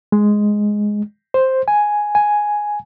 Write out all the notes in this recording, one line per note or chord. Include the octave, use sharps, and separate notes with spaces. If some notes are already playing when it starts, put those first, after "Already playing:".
G#3
C5
G#5
G#5